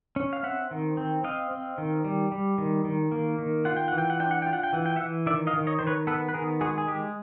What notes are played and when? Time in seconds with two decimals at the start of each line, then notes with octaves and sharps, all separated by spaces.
0.16 C#4
0.33 F5
0.43 C4 E5 F#5
0.71 D#3
0.97 C4
1.24 C4 D#5 F5
1.51 C4
1.78 D#3
2.05 G3
2.32 G3
2.58 D#3
2.85 D#3
3.12 A#3
3.39 D#3
3.65 F4 F#5
3.77 G5
3.88 E3 F#5
3.98 G5
4.10 F#5
4.20 D4 G5
4.31 F#5
4.42 F4 G5
4.53 F#5
4.63 G5
4.73 E3 F#5
4.86 G5
4.96 E3 E5 F#5
5.26 D#3 D5 E5
5.47 D#5 F5
5.54 D#3
5.67 C#5 D#5
5.79 D#3 C5
5.87 B4 C#5
6.07 B3 A4 B4
6.29 B4
6.34 D#3 G#4 A#4
6.61 G#3 F#4 G#4
6.78 G#4
6.88 G#3 G4